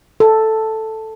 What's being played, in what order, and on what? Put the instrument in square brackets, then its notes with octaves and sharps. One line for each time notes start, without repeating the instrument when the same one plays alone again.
[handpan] A4